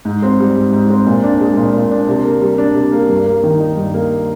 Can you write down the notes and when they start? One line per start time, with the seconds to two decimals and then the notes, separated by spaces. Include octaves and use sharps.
0.05 G#2
0.22 C4
0.40 G3
0.56 G#2
0.73 G#2
0.90 C4
1.07 A#2
1.24 D4
1.40 G#3
1.57 A#2
1.74 A#2
1.91 D4
2.09 C3
2.25 A#3
2.42 G3
2.58 D4
2.75 C3
2.92 A#3
3.09 G2
3.26 A#3
3.43 D#3
3.60 D#4
3.77 G2
3.94 A#3